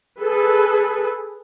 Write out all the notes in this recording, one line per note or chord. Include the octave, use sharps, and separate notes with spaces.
G#4 A4 B4